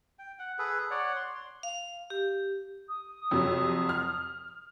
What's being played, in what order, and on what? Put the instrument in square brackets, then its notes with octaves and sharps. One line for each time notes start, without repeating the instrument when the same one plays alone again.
[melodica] G5
F#5
G#4 A4 B4
C#5 D5 F#5
C6
[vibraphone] F5
G4
[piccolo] D#6
[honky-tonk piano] F2 C3 F#3
F6